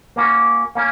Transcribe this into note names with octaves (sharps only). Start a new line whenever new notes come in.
A#3 C#4 F#4
A#3 C#4